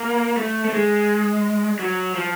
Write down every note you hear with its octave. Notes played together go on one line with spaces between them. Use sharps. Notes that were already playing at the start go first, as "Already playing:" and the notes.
Already playing: A#3
A3
A3
G#3
F#3
F3